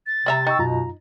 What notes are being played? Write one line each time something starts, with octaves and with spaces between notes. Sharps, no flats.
A6
C3 G3 E5 A#5
D#4 G5 C#6 E6
F#2 B2 F4 A#5